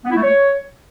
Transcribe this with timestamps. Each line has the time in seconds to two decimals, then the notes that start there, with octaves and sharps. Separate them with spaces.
0.05 B3
0.11 E4
0.16 A3
0.22 C#5